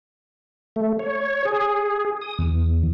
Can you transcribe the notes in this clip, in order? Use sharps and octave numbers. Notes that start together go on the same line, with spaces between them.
A3
C#5
G#4
D#6
E2